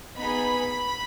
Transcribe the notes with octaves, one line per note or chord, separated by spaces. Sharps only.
B3 D#4 G#4 B5